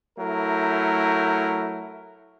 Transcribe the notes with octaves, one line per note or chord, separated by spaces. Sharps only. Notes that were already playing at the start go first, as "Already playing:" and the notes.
F#3 A3 E4 A#4